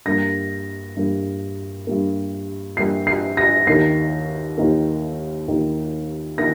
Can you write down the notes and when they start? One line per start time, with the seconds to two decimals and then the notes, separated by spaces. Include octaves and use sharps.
0.06 G2 G3 A#3 A#6
0.96 G2 G3 A#3
1.87 G2 G3 A#3
2.77 G2 G3 A#3 C7
3.07 C7
3.37 A#6
3.67 D#2 D#3 A#3 C7
4.58 D#2 D#3 A#3
5.48 D#2 D#3 A#3
6.38 D#3 A#3 A#6